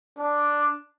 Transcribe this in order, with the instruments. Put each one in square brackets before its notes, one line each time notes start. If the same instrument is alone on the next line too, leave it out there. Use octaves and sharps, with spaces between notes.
[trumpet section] D4